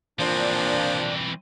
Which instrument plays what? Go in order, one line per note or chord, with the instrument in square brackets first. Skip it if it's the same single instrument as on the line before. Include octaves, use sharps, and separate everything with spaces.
[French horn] A#2 [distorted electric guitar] E3 C4 [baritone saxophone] F3 [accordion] D4